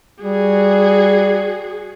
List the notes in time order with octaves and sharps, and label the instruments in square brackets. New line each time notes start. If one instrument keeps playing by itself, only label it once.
[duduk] G3 [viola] F#4 G#4